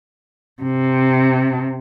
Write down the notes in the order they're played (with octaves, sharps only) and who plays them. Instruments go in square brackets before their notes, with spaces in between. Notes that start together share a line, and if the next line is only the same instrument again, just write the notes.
[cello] C3